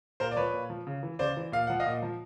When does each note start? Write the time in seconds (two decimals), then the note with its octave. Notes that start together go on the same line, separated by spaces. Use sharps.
0.20 A#2 A#4 C5
0.31 D5
0.37 F3 B4 C#5
0.53 A#2
0.70 F3
0.87 C#3
1.03 E3
1.19 C#3 C5 D5
1.37 E3
1.52 A#2 F5
1.67 F3 F#5
1.80 D#5 F5
1.86 A#2
2.02 F3